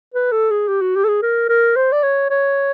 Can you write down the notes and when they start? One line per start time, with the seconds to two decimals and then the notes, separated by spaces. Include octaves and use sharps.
0.14 B4
0.32 A4
0.51 G#4
0.68 G4
0.82 F#4
0.96 G4
1.04 A4
1.08 G#4
1.22 A#4
1.49 A#4
1.76 C5
1.92 D5
2.03 C#5
2.30 C#5